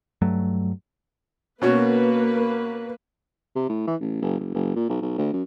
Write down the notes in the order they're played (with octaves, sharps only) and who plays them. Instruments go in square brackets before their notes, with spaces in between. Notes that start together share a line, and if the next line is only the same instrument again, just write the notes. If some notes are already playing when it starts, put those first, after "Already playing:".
[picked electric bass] G2 F#3 A3
[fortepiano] B2 C#4 F#4 [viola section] A#3 B4
[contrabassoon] C3
A2
E3
A1
F#1
F#1
F#1
A#2
B1
B1
D2
F#2